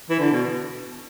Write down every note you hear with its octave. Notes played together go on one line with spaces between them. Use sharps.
E3
D3
B2